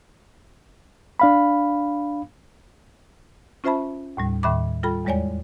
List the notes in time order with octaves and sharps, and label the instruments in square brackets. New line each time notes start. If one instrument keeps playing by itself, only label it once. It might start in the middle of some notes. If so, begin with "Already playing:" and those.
[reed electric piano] D4 F5 B5
[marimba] C#4 F4 C5 E5 A5 B5
D#2 A2 G3
D#2 A2 D#3 E5 B5 D6
G3 F4 A4 G5 B5
E2 G3 G#3 C#5 D5 G#5